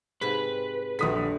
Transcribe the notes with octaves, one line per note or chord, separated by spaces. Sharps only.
G#2 C3 B4 C5
A#1 D3 F#3 G3 D#6 B6